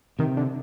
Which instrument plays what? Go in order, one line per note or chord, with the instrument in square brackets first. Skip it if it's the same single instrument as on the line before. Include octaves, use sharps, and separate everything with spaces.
[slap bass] C3 [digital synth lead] D#3
[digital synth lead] D3